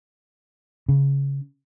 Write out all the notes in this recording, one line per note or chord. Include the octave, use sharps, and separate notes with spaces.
C#3